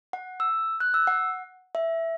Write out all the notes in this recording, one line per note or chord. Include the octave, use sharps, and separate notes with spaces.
F#5
E6
F#6
E6
F#5
E5